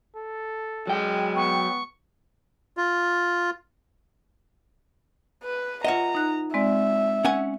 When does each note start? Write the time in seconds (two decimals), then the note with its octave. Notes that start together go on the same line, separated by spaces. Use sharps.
0.15 A4
0.87 F#3 G#3 G5
1.36 B3 C#6
2.77 F4
5.44 B4
5.84 F4 C#5 D#5 E5 F#5 A#5
6.15 D#4 F#6
6.54 G#3 C4 D5 E5
7.25 C#4 F#5 G#5